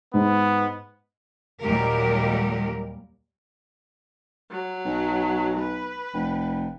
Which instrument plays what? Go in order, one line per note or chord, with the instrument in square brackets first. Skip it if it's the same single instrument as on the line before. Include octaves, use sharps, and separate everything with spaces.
[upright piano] G#2 [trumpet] B3
[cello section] D#2 A#2 F#3 G3 G4 A#4
[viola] F#3
[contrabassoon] B1
[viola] B4
[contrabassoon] F1